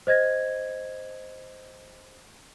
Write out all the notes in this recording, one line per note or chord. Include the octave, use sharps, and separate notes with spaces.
C5 D#5 G#6 A#6